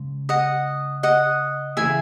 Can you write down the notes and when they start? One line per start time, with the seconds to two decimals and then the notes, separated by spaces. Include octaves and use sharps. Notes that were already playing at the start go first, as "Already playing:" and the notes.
Already playing: C#3 G#3
0.29 D#5 F#5
1.03 D#5 F#5
1.77 C#3 E3 A3 E4 G#4 E5 G#5